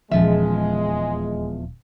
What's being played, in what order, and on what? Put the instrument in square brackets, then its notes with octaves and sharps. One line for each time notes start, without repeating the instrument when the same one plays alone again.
[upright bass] D#1 [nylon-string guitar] E2 F3 E5 [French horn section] G#3